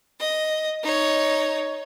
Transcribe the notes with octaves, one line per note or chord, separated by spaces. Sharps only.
D#5
D#4 C#5